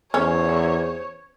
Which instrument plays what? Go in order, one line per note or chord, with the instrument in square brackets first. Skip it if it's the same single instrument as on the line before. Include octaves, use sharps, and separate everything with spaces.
[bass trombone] E2 [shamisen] C#4 [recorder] C5 [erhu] C#5